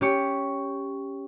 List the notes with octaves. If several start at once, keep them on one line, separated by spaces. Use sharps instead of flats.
C#4 G4 C#6